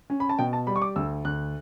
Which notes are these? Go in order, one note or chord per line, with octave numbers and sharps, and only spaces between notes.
C#4
B5
A5
B2 G5
A5
G3 B5
C#6
D6
D2 E6
D2 F#6